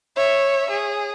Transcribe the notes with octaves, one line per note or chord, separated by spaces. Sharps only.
C#5 E5
G#4